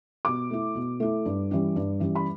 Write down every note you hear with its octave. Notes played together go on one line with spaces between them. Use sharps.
B2 D6
A3 E4
B2
A3 E4
G2
E3 G3 C#4
G2
E3 G3 C#4
B5